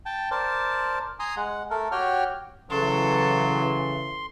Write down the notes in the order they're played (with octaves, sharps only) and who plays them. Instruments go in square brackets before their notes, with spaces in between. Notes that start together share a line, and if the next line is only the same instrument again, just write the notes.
[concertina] G5 A5
A#4 C5 D5 A5
G#5 A#5 C6 D#6
G#3 F#5
A3 A4 A#4
F#4 G4 C#5 G5 F6
[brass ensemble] C#3 E3 [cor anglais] F#3 [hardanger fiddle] A4 [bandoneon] C6